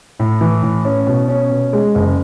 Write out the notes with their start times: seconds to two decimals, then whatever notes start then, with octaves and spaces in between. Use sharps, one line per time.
0.19 A2
0.41 E3
0.63 A2
0.85 C#4
1.07 B2
1.28 C#4
1.51 B2
1.73 G#3
1.95 F#1